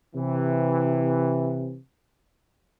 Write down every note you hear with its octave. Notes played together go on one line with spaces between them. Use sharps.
C3 E3